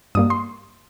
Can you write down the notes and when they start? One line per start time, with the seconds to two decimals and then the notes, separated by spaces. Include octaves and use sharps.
0.15 G2 G3 A#3 D#6
0.30 C6